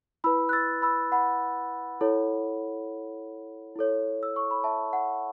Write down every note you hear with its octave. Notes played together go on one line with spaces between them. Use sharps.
E4 B4 B5 E6
F#6
E6 A6
B5 E6
F#5 B5
E4 A4 C#5
E4 A4 C#5
E6
C#6
B5
E5 A5
F#5